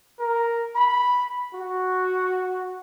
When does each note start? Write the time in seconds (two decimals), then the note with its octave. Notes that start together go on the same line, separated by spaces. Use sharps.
0.20 A#4
0.76 B5
1.55 F#4